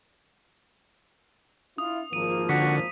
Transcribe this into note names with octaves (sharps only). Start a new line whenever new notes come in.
D4 E4 F4 D#6
G#1 F3 A#3 D#7
D3 F#4 C#6 B6